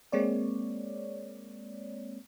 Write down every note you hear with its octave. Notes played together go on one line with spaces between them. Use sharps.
G#3 A#3 C4 C#5 D5